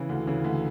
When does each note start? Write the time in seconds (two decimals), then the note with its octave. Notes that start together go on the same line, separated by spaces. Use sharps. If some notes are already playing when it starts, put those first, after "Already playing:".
Already playing: C#3 E3
0.09 D2
0.27 C#3 E3
0.44 D2